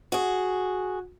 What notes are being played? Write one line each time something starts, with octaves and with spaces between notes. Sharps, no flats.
F#4 G#4